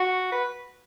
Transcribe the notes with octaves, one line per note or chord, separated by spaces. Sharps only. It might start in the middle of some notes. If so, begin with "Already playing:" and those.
Already playing: F#4
B4